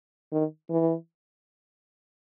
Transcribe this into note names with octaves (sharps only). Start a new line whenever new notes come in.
D#3
E3